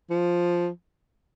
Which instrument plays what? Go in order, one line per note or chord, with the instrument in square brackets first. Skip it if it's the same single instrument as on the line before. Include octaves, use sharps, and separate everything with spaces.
[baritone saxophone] F3